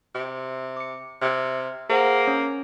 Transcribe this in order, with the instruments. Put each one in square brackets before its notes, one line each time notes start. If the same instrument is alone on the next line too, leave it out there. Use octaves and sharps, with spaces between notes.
[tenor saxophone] C3
[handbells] D6 C#7
[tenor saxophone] C3 [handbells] F6 G#6
[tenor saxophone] A#3 [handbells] G#4 C5 F#5
[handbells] C#4 C#5